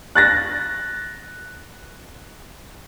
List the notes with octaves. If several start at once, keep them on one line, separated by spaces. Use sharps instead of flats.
F#6 A6 A#6